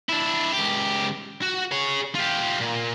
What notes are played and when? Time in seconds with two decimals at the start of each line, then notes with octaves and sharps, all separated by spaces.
0.09 D4 E4
0.53 C#2 G4
1.42 F#4
1.71 G#4 C#5
2.15 F4 G4
2.60 A#2